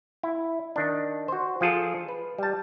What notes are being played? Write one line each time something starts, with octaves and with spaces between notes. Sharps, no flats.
E4
D#3 D4
F#4 C5
F3 F4 G#4 A4
B4
G3 A5